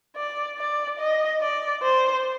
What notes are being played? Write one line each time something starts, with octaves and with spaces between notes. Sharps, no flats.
D5
D5
D#5
D5
C5